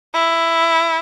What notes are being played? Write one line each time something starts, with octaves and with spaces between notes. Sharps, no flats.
E4